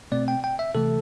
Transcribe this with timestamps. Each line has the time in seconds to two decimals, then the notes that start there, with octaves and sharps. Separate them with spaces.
0.12 B2 A3 C4 D5
0.28 G5
0.44 G5
0.59 E5
0.75 C3 E3 A3 A4